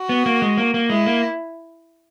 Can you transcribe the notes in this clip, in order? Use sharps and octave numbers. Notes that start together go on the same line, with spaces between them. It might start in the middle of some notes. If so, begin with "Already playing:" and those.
Already playing: F#4
B3
A#3
G#3
A#3
A#3
G#3 E4
A#3